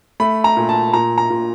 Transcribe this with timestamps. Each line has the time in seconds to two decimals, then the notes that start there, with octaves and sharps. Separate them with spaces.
0.20 A3 B5
0.44 A#5
0.57 A#2
0.69 A5
0.93 A#2 A#5
1.18 A#5
1.30 A#2